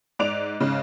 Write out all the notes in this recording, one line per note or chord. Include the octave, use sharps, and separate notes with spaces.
G#2 D5 D7 F7
G#2 C#3